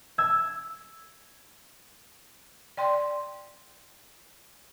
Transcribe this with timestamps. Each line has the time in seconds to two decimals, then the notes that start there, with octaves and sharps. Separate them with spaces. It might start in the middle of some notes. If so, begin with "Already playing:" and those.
0.18 E6 G#6
2.77 D5 G5 C6